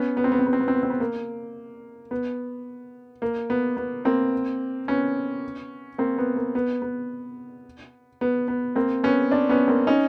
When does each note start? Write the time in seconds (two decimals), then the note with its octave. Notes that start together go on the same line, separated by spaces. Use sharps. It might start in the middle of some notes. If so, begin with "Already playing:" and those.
Already playing: B3 C#4
0.17 B3
0.24 C4
0.32 B3
0.39 C4
0.47 B3
0.53 C4
0.60 B3
0.68 C4
0.75 B3
0.83 C4
0.90 B3
1.00 A#3
2.11 B3
3.22 A#3
3.50 B3
3.77 B3
4.05 A#3 C4
4.88 B3 C#4
5.98 A#3 C4
6.18 B3
6.36 A#3
6.55 B3
6.82 B3
8.21 B3
8.48 B3
8.75 A#3 C4
9.04 B3 C#4
9.31 C4 D4
9.49 B3 C#4
9.68 A#3 C4
9.87 C#4 D#4